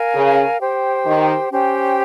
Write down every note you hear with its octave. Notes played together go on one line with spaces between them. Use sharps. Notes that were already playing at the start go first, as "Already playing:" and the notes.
Already playing: A#4 F5 G#5
C#3
G4 C5 G5
D#3
C#4 G4 C5 G5